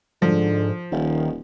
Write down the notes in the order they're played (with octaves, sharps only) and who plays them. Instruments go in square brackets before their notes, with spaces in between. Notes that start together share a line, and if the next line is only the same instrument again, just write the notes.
[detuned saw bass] G#2 [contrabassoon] D3 [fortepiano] F3
[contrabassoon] D#1 [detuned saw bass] D#3